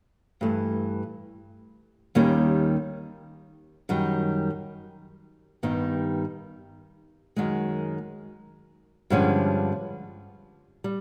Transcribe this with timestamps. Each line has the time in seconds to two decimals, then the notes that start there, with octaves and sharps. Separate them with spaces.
0.41 G2 E3 A3
2.15 D#2 D#3 G3 A#3 C#4
3.89 F#2 D#3 G3
5.63 G2 D#3 G3 B3 D#4
7.36 F#2 D#3 G#3
9.10 G2 D3 F3 G#3 C#4
10.84 G3